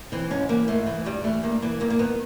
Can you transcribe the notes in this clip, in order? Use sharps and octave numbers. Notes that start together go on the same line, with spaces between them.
E3 C4
G#2 C#4
E3 A#3
G#2 A3
E3
G2 G3
E3 A3
G2 A#3
E3 A#3
G2 A#3
A#3
D#3 B3